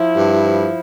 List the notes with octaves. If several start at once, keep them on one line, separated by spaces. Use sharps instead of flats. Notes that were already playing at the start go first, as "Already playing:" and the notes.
Already playing: F3 E4
G2
F3